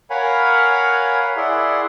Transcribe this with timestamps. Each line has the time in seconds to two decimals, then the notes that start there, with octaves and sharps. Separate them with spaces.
0.10 A#4 C#5 F5 F#5 G#5 B5
1.37 E4 G#4 D5 E5 F#5 C6